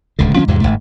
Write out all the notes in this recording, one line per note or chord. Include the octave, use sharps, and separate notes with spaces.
D1 C#2 D3
D#3 F3 B3 C#4
E2 G#2 C3 F3
G1 C2 G#2 A3